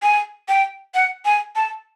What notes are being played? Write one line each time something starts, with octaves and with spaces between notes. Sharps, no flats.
G#5
G5
F#5
G#5
A5